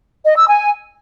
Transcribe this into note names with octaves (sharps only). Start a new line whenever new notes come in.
D#5
E6
G#5